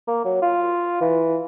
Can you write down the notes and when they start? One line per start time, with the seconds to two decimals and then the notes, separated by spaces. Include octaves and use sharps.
0.08 A#3
0.25 F#3
0.42 F4
1.01 E3